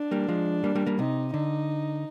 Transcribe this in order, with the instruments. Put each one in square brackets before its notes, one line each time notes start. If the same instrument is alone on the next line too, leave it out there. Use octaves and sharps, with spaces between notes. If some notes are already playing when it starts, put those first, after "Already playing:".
Already playing: [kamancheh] D4
[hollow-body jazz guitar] G3 A#3
F3 G#3
G3 A#3
G3 A#3
G3 A#3
[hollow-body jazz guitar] C3 [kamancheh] D#4
[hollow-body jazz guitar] D3 [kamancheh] D#4